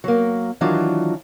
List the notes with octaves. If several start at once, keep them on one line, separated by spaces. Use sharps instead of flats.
F#3 A#3
D#3 E3 F#3 D4 F4